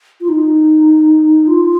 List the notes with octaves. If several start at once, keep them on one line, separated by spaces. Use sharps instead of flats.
F4
D#4
F4